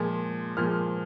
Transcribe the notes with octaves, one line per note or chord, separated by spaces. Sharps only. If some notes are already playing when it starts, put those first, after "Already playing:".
Already playing: A#2 F3 G#3
A#2 F3 G#3 F6